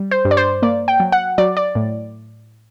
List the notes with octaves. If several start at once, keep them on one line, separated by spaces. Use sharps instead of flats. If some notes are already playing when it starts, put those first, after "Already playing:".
Already playing: G3
C5
G2
D5
C5
A#3 D5
G5
F#3
F#5
F#3 D5
D5
A2